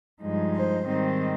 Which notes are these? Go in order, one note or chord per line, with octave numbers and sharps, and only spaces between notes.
G2 F3 G#3 D#4
C5
G#2 D#3 G3 C4 D#4